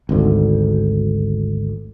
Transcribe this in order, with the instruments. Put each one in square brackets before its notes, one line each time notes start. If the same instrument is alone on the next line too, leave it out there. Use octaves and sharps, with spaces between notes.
[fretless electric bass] G#1 D2